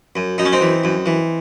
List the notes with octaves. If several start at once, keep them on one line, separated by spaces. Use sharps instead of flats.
F#2
F#2 D#4
C#4
C4 D#4
E3
F#2
E3